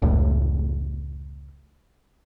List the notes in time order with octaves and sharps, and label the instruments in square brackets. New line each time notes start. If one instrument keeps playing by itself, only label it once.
[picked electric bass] F1 C#2 A2